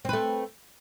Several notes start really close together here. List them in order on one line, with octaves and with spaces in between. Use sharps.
C4 B4 A3